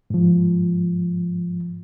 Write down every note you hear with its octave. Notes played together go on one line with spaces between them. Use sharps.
G#2 F3